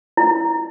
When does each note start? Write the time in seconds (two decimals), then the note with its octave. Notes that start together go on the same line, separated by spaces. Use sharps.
0.17 E4